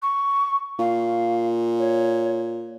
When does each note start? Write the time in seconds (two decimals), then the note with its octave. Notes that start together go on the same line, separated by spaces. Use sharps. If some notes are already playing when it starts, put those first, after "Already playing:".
0.03 C#6
0.79 A#2 F5
1.79 C#5